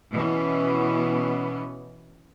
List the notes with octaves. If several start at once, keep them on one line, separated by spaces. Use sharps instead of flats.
B2 E3 B3 C#4